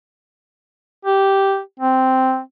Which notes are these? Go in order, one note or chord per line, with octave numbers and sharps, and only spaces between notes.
G4
C4